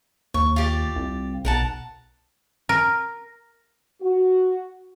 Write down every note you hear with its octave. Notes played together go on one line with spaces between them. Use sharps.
D#2 C#6
F4 G4 D5
C2
B1 A#4 F#5 A5
A#4
F#4